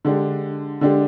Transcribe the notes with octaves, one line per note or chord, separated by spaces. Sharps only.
D3 G#3 D4 G4
D3 G#3 D4 G4